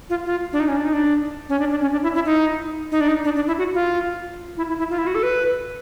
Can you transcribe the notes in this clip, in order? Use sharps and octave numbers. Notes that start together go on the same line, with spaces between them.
F4
F4
D4
D#4
C#4
D4
D#4
D4
C#4
D4
D4
C#4
D4
E4
E4
D#4
D#4
D4
D#4
D4
D4
E4
F#4
F4
E4
E4
E4
F4
E4
F#4
A4
B4